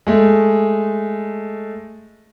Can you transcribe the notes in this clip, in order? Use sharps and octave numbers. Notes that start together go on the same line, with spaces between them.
G#3 A3